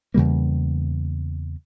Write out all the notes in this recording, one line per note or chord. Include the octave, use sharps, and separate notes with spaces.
E2 C#3 G3 A#3